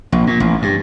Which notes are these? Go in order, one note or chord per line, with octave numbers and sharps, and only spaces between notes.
A#1
A#2
A1
G2